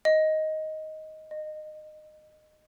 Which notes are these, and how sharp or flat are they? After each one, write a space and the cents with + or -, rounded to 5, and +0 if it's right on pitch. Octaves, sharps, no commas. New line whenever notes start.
D#5 +10
D#5 -20